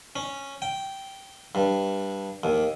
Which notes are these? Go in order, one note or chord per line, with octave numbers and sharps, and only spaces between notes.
C#4
G5
G2
D#2